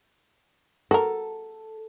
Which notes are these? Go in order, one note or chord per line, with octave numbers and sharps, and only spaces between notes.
F#4 A4 A#4